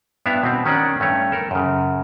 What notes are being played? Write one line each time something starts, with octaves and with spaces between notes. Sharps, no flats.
G2 B3 D4 E4 E5 F5
B2 C4
D#3 C#4 D4 D5 F#5
G2 A3 C#4 C#5
A4 A#4
F#2 C#3